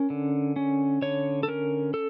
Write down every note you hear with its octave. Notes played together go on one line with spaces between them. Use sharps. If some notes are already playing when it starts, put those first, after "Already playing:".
Already playing: C#4 A#4
D3
C#4
D3 C#5
A4
C#4 A#4
A4